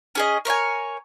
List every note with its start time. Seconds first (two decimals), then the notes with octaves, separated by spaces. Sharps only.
0.15 C#4 G#4 D#5
0.45 A#4 C#5 E5 G#5